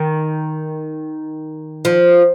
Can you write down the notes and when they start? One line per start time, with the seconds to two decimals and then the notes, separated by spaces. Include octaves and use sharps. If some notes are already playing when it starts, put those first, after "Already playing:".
Already playing: D#3
1.85 F3